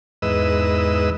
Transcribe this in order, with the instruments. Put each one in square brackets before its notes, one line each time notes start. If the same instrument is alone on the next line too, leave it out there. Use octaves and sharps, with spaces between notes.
[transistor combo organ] E2 G#2 B4 D#5 E6